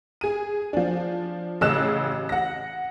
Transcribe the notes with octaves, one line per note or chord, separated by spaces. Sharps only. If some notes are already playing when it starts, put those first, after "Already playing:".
G#4 D#7
F3 D4
A1 C#3 D#5 E6 F#6 E7
F#5 A#6